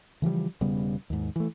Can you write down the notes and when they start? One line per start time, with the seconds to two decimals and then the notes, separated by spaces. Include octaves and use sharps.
0.22 C#3 E3 F3 G3
0.61 E1 C#3 G3 B3
1.10 D#2 G#2
1.36 E3 A3